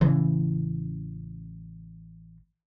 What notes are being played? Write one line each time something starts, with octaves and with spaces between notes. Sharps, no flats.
A1 C#3 E3